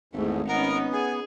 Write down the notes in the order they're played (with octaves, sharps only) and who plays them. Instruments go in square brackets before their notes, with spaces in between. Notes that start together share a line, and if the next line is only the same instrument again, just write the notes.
[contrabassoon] G#1 [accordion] E2 G#2 [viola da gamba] A3
[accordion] B3 [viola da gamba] C#4 D#4 [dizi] A#4
[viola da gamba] G#4 [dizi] G#5